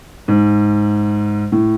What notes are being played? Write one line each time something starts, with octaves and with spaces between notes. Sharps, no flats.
G#2
A2